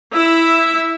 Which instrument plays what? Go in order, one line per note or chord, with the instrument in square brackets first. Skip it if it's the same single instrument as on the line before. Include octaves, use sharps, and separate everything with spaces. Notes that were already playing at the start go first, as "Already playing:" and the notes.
[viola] E4 E5